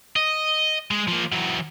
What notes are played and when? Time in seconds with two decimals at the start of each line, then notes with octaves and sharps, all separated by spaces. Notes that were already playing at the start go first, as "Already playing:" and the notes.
0.16 D#5
0.91 G#3
1.08 F3 A#3
1.32 E3 F#3